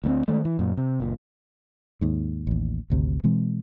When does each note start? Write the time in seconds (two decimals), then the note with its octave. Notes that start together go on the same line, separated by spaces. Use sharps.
0.04 D2 A3 C4
0.28 D#3 G#3 A3
0.45 E3
0.59 F#2 A#2
0.77 C3
1.00 F#1 A#2
2.01 D#2 G#2
2.47 A1 D#2
2.90 G#1 D2 C3
3.24 B2 E3 G#3 C4